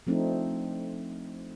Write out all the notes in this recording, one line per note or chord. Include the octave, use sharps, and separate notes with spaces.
F3 A3 C4 D4 D#4